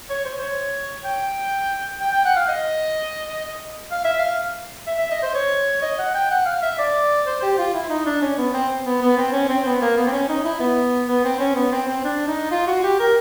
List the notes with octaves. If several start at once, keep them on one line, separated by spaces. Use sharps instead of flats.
C#5
C5
C#5
G5
G5
G5
F#5
F5
D#5
F5
E5
F5
E5
E5
D#5
C5
C#5
D#5
F#5
G5
F#5
F5
E5
D5
C5
G4
F4
E4
D#4
D4
C#4
B3
C4
B3
B3
C4
C#4
C4
B3
A#3
B3
C4
C#4
D#4
E4
B3
B3
C4
C#4
B3
C4
C4
D4
D#4
F4
F#4
G4
A#4